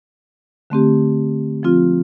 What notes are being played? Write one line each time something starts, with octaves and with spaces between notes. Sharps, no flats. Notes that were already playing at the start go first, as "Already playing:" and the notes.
D3 A3 C4 G4
F3 C4 F4